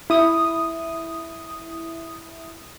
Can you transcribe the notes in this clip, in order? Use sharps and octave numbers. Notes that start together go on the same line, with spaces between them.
E4 D#6